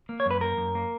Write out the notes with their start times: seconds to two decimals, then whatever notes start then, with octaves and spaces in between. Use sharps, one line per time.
0.09 A#3
0.20 C#5
0.26 F#2 B4
0.41 A#3 A#4
0.57 F#2
0.75 A#3